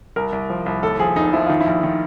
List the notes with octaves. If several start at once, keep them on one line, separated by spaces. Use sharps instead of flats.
C2 A#4
C2
F3
C2
D#2 A4
F3 G#4
F1 D#4
F3 E4
D#3 F4
E4
A#1
D#3